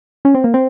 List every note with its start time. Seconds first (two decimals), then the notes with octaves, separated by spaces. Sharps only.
0.25 C#4
0.35 C4
0.44 A#3
0.54 C4